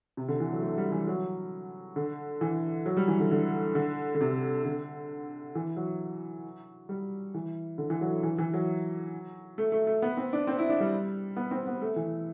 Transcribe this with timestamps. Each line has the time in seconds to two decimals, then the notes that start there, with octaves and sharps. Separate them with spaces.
0.17 C3
0.28 D3
0.40 E3
0.52 F#3
0.62 A3
0.78 G3
0.92 E3
1.08 F#3
1.96 D3
2.41 E3
2.86 F#3
2.97 G3
3.08 E3
3.20 D3
3.31 D3
3.75 D3
4.15 D3
4.21 C3
4.65 D3
5.55 E3
5.76 F#3
6.89 G3
7.34 E3
7.78 D3
7.90 E3
8.01 F#3
8.23 E3
8.38 E3
8.53 F#3
9.58 A3
9.72 A3
9.87 A3
10.02 B3
10.17 C4
10.33 D4
10.47 C4
10.59 E4
10.69 D4
10.80 G3
11.36 B3
11.51 C4
11.67 B3
11.81 A3
11.96 E3